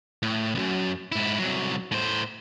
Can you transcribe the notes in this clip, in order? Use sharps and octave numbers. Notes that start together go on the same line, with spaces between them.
A2
C2 F#2
G#2 E4
C2 F#3
A2 C5